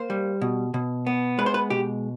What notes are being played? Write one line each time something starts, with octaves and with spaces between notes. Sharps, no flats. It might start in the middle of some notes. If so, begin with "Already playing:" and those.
Already playing: A#3 C5
G3
B2
B2
B3
G#3 B4
C5
B4
B2 G4